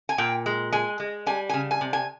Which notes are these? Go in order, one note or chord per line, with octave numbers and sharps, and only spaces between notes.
G#5
A#2 G5
G#3
G#3 G#5
G#3
G3 G#5
C#3 G#5
G#5
C3
G#5